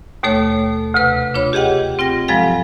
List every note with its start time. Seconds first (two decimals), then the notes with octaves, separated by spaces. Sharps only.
0.23 D#2 B2 A3 A4 C#5
0.94 D2 C3 B4
1.34 D4 F4 C#5 B5
1.53 G4 G#4 D#5 F#5 G5
1.99 C4 F4 G5 A#6
2.28 G2 F3 F#3 G#3 A4 F5